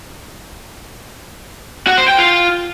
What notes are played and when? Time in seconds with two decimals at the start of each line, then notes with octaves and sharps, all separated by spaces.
1.87 F#4
1.98 C5
2.08 G5
2.18 F4